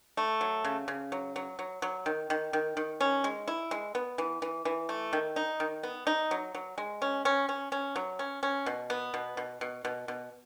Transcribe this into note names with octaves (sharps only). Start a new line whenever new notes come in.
A3
F#3
C#3
C#3
F#3
F#3
F#3
F#3
D#3
D#3
D#3
D#3
C#4
G#3
E4
G#3
B3
E3
E3
E3
A3
D#3
D#4
D#3
B3
D#4
F#3
F#3
G#3
C#4
C#4
C#4
C#4
F#3
C#4
C#4
B2
B3
B2
B2
B2
B2
B2